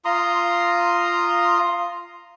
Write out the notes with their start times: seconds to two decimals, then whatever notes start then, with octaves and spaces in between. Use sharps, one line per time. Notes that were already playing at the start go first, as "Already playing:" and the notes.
0.05 F4 A#5 C6 D#6